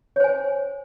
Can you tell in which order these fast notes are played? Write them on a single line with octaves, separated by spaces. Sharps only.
C#5 C5 G#5